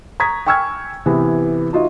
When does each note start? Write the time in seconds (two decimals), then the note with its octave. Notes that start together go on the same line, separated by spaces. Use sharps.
0.20 A#5 C#6 D#6 G#6 B6
0.46 G5 G#5 C#6 E6 F6 G#6
1.06 C3 E3 B3
1.73 D#4 F4 F#4 D#5 E5